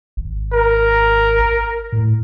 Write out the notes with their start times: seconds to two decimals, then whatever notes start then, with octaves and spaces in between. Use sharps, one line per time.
0.17 G#1
0.53 A#4
1.92 A2